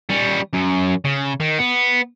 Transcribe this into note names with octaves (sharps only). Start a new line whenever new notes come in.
G3 C#4
F#2
C#3
D#3
B3